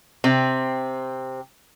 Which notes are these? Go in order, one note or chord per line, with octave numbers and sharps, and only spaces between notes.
C3 C4